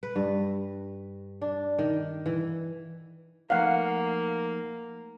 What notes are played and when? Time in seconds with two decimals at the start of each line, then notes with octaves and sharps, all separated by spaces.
0.03 B4
0.16 G2
1.42 D4
1.79 D#3
2.26 E3
3.50 F3 A3 A#3 D#4 F5 F#5